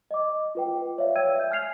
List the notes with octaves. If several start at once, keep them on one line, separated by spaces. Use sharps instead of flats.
D#5 D6
F4 B4 G5
C#5 D5 E5 F5
C#5 G5 E6 G#6 D#7
E5 G6
G#5 F6 G#6 C7 F7